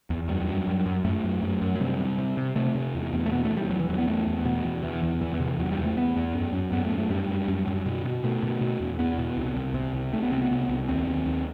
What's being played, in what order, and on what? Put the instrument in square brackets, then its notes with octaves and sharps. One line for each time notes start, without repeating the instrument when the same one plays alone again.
[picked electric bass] E2
F#2 G3
F#2
F#2
F#2
F#2 A3
F#2
F#2
F#2
F#3
C3 G3
C3
C3
C3
C3 A3
C3
E2
E2
A3
B2 B3
A3
E2
G3
E2 F#3
E3
E2 F#3
B3
E2 A3
E2
B2 B3
E2
E2 E3
E2
E2 E3
E3
C3
E3
E2 F#3
G3
E2
A3
E2 B3
E2
F#2
F#2
F#2 B3
A3
F#2
A3
F#2 G3
F#2
F#2
F#2
B2
B2
B2 A3
B2
B2
E2
E2 B3
B2
C2
C2
C3
C2
C2 A3
B3
C2 C4
B3
C2
C2
D#2 C4
D#2
D#2